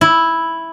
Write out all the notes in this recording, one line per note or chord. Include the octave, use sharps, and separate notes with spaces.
E4